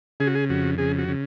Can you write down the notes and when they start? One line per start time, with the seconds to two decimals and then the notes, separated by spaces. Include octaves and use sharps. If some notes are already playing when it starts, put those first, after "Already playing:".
0.20 C#3 G#4
0.27 F#4
0.35 G#4
0.49 F2 F#4
0.78 C#3 G#4
0.99 F#4
1.08 C#3